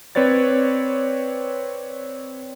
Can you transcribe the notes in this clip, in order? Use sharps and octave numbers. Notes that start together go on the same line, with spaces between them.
C4 B4 C#5 D5 A6